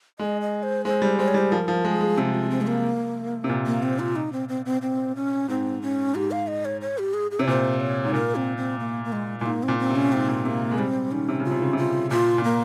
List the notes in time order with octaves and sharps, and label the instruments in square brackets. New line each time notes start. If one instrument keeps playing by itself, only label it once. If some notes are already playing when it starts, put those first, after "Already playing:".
[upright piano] G#3 [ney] D#5
[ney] D#5
C5
[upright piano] G#3 [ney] C5
[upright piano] G3
[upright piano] G#3 [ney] C5
[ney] C#5
[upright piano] G3
[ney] C5
[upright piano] F3 [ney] A#4
[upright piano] F3
[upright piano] G#3 [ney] G#4
[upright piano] G#3
[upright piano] C3 [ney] G4
[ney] F4
C4
G#3
A#3
[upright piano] C3
A#2
[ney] A#3
C4
F4
D#4
C4
C4
C4
C4
C#4
[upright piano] G#2 [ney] C4
[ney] C#4
[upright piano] G#2 [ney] G4
[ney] F5
D#5
C#5
C#5
G4
G#4
G#4
[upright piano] C3 [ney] C#5
[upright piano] A#2 [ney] C5
[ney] C#5
[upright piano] G#2
[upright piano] A#2 [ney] A#4
[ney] C4
C4
A#3
A#3
G#3
[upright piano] A#2 [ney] G#3
[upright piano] G#2 [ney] A#3
[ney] C4
[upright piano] A#2
[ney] C4
[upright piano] C3
[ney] C#4
[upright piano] G#2 [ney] C4
[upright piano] A#2
[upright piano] C3 [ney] A#3
[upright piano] G#3
[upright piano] G3 [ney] C4
[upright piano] D#3 [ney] C#4
[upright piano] C3
[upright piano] C#3 [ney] F4
[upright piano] C3
C#3
[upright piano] C3 [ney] F4
[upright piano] A#2 [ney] F4
[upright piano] A#2
[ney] A#3